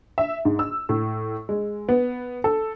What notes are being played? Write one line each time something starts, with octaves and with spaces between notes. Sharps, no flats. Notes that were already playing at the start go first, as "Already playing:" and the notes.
E5
G#2
E6
A2
G#3
B3
A4